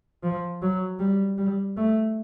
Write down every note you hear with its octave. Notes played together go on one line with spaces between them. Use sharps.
F3
F#3
G3
G3
A3